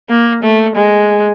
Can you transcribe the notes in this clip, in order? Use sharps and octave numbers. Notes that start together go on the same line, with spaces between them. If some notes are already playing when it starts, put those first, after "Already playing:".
A#3
A3
G#3